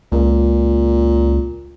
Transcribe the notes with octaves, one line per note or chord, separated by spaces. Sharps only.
C#2 A#2